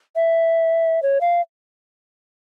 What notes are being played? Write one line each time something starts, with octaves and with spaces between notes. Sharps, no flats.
E5
C#5
F5